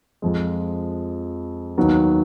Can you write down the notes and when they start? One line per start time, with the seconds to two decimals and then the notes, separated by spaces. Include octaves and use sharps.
0.22 F2 F3 G#3
1.77 D#2 D#3 F#3 B3